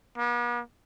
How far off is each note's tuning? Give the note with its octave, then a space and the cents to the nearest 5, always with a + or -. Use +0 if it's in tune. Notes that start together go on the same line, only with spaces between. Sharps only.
B3 -45